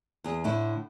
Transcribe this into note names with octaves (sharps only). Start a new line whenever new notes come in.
E2 G#4
A2 D3 E4